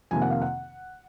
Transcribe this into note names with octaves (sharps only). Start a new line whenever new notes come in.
F2 C3 D#3 A#3 G#5
F#5
F5
F#5